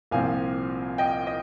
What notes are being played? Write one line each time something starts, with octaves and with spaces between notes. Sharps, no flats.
C2 A#2 F3 C4 F5 G#5
D#5 G5
D#5